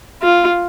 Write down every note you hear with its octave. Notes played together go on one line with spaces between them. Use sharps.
F4